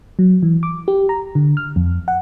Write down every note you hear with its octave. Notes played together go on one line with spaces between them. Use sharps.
F#3
E3
D6
G4
A#5
D3
F6
F2
F#5